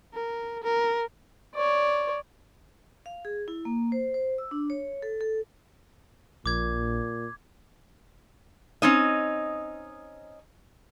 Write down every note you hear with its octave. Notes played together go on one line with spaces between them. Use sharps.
A#4
A#4
C#5 D5
F5
G#4
E4
A#3
C5
C5
E6
D4
C#5
A4
A4
A#1 A#2 D6 G#6
C4 C#4 D#4 D#5